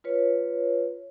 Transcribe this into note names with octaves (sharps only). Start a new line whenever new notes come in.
F4 B4 C#5